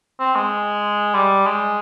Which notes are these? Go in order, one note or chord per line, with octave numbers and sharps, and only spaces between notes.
C4
G#3
G3
G#3